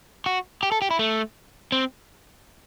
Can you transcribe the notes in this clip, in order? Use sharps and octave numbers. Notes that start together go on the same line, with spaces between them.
F#4
G4
A4
G4
E4
A3
C4